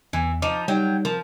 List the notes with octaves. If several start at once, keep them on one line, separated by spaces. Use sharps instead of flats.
E2 E3
F3 D#4 D6
F#3 G3 D#4 G5
F3 A#4